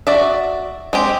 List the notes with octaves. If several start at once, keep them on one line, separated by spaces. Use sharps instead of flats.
F#4 D5 E5
G#3 C4 G4